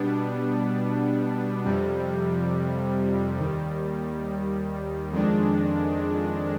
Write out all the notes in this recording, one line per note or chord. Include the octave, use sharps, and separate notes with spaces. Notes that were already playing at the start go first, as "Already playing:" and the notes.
Already playing: B2 G3 B3 D4
F2 C3 G3
D#2 D#3 G3
F2 D#3 G#3 D4